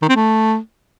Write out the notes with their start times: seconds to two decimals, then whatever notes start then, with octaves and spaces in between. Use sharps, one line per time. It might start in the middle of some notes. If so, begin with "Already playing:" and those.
0.02 D#3
0.09 C4
0.16 A3